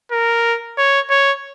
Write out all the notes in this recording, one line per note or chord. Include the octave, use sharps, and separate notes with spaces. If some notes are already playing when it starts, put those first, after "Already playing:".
A#4
C#5
C#5